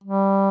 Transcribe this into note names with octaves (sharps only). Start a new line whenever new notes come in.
G3